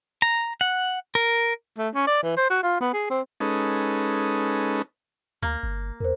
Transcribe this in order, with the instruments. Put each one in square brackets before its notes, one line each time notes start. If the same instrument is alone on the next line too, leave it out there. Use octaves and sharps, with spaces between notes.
[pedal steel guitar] A#5
F#5
A#4
[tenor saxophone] A3
C#4
D5
E3
C5
F#4
F4
B3
G#4
C4
[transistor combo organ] G#3 C#4 D#4 A4 B4
[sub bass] D2 [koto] A#3
[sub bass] G1
[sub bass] E2 [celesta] A#4 C5